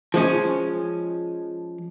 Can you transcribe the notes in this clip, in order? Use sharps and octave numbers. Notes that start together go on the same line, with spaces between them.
F3 G#3 C#4